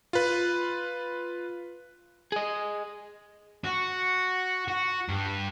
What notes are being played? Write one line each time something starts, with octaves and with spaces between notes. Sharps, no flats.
F4 B4
G#4 D#5
F#4
F#4
G2